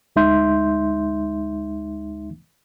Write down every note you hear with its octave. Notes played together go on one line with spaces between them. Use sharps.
D2 G#3 D#4 E5 C6 G6